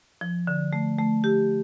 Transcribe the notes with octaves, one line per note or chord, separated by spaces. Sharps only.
F3
D3
A3
A3
G4